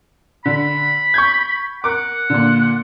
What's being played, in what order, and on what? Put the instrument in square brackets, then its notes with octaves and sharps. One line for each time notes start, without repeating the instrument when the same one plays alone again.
[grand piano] D3 [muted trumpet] B5
[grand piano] C#6 G6 G#6
[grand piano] A#4 D6 [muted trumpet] F#5
[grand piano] A#2 D3